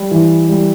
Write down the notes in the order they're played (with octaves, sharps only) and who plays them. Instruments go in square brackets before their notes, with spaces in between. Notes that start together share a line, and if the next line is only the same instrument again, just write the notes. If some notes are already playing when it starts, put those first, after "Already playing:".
Already playing: [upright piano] G3
E3
G3